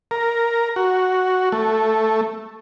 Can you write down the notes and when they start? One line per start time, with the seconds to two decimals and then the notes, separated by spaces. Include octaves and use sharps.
0.11 A#4
0.76 F#4
1.52 A3